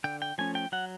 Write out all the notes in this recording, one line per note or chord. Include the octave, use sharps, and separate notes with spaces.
D3 G5
G5
F3 A3 C#4 G#5
G5
F#3 F#5